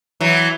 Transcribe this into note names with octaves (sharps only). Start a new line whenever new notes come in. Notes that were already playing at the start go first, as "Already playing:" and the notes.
E3 F#3